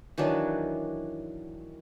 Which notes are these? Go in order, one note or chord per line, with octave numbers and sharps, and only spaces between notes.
D#3 E3 F#3 D4